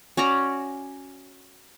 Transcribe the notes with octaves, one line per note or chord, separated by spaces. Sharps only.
C#4 F#4 D5 A#5